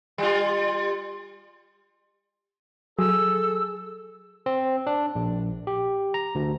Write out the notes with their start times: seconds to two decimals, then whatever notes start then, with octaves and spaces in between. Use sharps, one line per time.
0.18 G3 F4
2.99 F#3 G#4 A4 E6
4.46 C4
4.87 D4
5.15 A#1
5.67 G4
6.14 A#5
6.35 D2